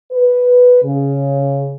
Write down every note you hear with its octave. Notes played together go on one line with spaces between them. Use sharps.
B4
C#3